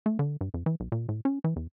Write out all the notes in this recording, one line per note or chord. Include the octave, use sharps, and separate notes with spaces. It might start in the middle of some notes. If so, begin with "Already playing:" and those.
A3
D3
G2
F2
E3
B1
A#2
A2
C#4
E3
E2